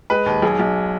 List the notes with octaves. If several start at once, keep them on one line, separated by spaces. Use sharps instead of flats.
G#3 B4
D#2
B1 G#4
B1